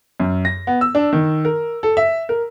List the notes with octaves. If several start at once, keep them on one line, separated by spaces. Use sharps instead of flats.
F#2
A#6
B3
E6
D4
D#3
A#4
A4
E5
A#4